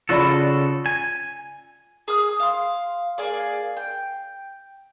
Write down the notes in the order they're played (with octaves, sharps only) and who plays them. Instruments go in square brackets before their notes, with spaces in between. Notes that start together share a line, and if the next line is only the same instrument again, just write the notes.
[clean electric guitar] C#3 F#4 A4 [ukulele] F4 D5 B5
[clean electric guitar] G#5
[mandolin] G#4 D#6 F6
F5 C6
A#3 G#4 D5
G5